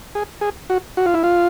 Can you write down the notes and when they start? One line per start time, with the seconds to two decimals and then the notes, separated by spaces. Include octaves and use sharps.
0.15 G#4
0.41 G#4
0.70 F#4
0.97 F#4
1.06 F4
1.14 E4
1.24 F4